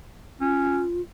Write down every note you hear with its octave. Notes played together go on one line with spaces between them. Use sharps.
C#4 F4